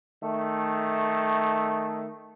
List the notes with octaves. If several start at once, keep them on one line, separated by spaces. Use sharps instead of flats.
D#3 A3